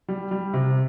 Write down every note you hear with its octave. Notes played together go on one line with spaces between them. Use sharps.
G3
G3
C3